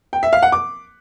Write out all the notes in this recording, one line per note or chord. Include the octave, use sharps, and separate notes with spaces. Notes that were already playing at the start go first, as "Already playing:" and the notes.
G5
E5
F5
F#5
D6